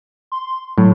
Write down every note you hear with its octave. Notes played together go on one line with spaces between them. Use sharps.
C6
A2 F#3